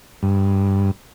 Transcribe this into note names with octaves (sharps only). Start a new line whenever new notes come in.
G2